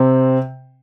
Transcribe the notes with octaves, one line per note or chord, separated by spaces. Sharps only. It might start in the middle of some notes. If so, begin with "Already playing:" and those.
Already playing: C3 C4